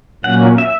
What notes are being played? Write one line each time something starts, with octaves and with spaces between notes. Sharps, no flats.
A#2 F#3 A#3 C#4 F#5
E5